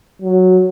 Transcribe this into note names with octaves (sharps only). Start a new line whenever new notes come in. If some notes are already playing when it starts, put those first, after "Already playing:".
F#3